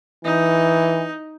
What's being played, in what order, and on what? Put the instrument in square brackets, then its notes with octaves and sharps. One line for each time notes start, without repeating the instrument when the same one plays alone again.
[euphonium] E3 [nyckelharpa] D#4